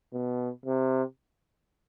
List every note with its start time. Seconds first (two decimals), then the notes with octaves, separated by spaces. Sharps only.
0.13 B2
0.66 C3